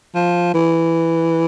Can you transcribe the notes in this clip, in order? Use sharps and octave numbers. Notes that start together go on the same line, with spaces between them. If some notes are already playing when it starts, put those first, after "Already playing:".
F3
E3